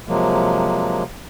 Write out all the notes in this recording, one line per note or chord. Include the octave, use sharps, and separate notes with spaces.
C3 F3 F#3 G#3 A#3